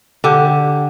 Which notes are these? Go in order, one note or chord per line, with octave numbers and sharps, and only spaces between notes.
D3 G4